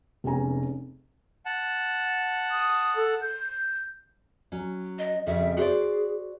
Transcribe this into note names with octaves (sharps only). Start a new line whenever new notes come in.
F1 G#3 B3 C#4 G#5 A#5
F#5 A5
D#6
A4
G6
F#3 C#4
D#5
F2 C#3 F#4 E5
F#4 G#4 C5 D5